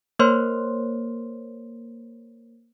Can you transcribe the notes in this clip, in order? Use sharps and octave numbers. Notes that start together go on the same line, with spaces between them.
A#3 A#4 C5 C#5 C6